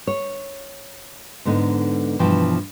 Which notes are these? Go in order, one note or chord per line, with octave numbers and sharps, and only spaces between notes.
C#5
G#2 D3 B3 D#4
G2 B2 E3 F3 G5